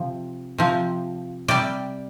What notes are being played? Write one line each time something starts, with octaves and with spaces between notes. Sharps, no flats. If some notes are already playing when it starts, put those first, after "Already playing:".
Already playing: C3 F3
C3 F3
C3 G3 D5